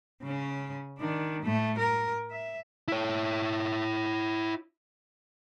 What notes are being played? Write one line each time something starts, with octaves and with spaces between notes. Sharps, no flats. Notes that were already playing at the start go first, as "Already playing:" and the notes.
C#3 C#4
D#3 D4
A2 A3
A#4
E5
E4 C#5